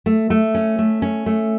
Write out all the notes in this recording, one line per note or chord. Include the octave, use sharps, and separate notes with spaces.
A3
A3
C#4
A3
C#4
A3